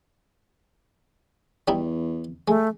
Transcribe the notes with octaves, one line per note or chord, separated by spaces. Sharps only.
E2 G3 D#4 E4
G#3 A3